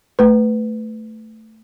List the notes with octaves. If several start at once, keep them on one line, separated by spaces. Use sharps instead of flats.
A3 B4